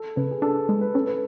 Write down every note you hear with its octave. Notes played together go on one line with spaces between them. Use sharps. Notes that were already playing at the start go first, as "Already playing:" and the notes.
Already playing: A4
C#3 B4
G#4
D4 A4
G#3
B4
C#4 A4
B4